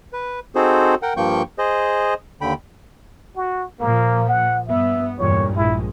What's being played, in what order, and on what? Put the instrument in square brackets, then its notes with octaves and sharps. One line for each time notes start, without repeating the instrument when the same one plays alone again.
[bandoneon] B4
C4 D#4 F#4 G#4 A4 C5
A#4 F#5 G5
G2 F3 A#3 G5 C#6 G6
G#4 C5 D#5
D#2 D3 G5 B5
[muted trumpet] F#4
[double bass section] A#2 F3 [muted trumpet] A#3
[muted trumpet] F#5
[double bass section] G2 B3 [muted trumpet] E5
[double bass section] E2 G2 A#2 [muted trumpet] C#5
[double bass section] A#1 G#3 [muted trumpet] E4